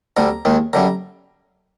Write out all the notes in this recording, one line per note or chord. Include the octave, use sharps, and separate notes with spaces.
D2 D3 G3 A#5
D#2 D#3 G#3
F#2 D3 G3 A#5